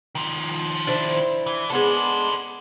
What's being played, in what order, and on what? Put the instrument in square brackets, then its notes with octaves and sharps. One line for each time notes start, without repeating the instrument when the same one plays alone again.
[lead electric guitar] D#3 F3
[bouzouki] D4 E4 C5
[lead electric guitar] E3
[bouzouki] G#3 B3 D4 [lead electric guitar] A4 C5